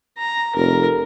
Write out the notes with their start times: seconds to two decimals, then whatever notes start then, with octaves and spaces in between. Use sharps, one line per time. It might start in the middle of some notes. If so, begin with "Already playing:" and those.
0.18 A#5
0.55 F1 A#4